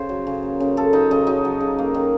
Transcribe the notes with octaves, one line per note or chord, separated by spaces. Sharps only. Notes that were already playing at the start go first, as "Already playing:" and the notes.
Already playing: C#3 C5
F#3
C#3
A#3
C#3
F#3 A4
F#3 D#4
C#3 D#4
F#3 D#4
F#3
C#3
A#3
D#3